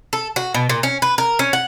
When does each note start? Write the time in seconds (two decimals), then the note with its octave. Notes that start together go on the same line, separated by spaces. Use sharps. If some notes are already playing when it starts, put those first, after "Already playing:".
0.13 A4
0.36 F#4
0.54 B2
0.69 A#2
0.83 C#4
1.02 B4
1.18 A#4
1.39 C#4
1.53 F#5